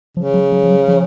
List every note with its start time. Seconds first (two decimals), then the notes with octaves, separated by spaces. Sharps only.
0.17 C#3 F3
0.34 F#3
0.52 F#3
0.63 F3
0.70 F#3
0.88 F3